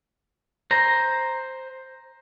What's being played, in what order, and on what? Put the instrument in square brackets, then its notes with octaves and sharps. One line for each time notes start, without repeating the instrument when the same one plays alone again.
[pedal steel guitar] C5 A#5